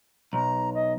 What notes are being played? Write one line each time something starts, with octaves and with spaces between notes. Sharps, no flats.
B1 A#5
D#5